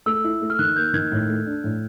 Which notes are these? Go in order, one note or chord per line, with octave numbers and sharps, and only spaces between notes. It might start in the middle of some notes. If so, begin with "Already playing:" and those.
A3 E6
E4
A3
F6
D#3 F#6
A#3 G6
D#3 G#6
A2
A3
D4
A2